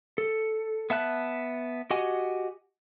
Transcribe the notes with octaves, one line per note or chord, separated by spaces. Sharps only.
A4
B3 E5 A5 F#6
F#4 G4 D#5 F#5 G#5